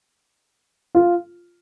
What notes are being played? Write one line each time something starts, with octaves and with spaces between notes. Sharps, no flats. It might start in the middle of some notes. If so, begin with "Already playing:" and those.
F4